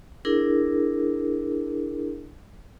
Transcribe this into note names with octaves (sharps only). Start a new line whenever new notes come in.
D4 E4 G#4 A#4